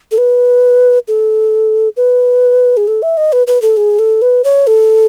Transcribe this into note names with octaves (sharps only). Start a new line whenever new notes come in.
A4
B4
A4
B4
G#4
A4
E5
D#5
B4
B4
A4
G#4
A4
B4
C#5
A4